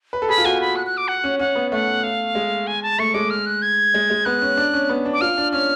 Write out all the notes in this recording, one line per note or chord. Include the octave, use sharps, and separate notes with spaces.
B4
A4
G#4 B5
F4
F#4 G#5
B5
F#6
F#6
D6
F#5
C#4
C#4 F#5
B3
A3 F#5
F5
G#3
G#5
A5
A3 C#6
G#3 D6
F6
F#6
G#6
G#3
G#3
B3 F#6
C#4
D4
C#4
B3
D4
D6
F4 F6
D4
C#4 F6